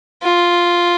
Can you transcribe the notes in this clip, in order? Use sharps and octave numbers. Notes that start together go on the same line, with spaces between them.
F4